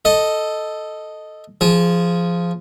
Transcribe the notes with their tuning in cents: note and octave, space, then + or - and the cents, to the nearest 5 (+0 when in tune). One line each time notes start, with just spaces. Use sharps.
A4 +0 D#5 +0
F3 -10 G#4 +0